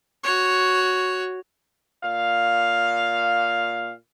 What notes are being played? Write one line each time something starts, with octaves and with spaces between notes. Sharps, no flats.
F#4 C#5
A#2 F5